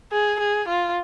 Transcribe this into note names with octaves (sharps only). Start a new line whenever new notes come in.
G#4
G#4
F4